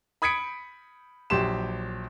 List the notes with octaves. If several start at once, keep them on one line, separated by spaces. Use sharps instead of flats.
B5 D#6 G#6 B6 C#7 D7
A#1 F#3 G4 C6 E7